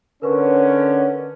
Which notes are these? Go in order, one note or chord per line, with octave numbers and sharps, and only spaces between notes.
D3 C#4 A#4 B4 C#6